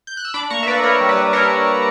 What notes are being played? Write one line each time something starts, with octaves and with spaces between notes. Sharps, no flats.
G6
F#6
E6
D4 B5 D6
A#3 A#5 C#6
E5
A#3 B4 D5
A#3 A#4 C#5
G3
B4
G3
D4 A#4 C#5